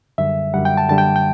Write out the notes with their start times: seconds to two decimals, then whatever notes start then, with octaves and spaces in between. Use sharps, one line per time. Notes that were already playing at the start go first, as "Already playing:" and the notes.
0.18 F#2 D3 G3 E5
0.54 F#2 D3 G3 F#5
0.65 G5
0.77 A5
0.89 F#2 D3 G3 A5
0.98 G5
1.16 G5